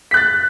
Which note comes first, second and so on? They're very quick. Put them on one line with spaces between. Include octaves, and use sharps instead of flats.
B6 F#6 A6